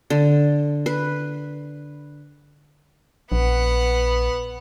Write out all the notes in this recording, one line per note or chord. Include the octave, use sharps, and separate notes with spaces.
D3
B4
A#1 B3 F#5